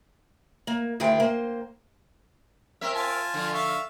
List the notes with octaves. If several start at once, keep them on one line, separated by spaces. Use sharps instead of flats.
A#3
D2 D#3 E4 G#4 G5
A#3 C5
C4 A#4 E5
F4 G#5 A5
D3 F3
E5 F5 C#6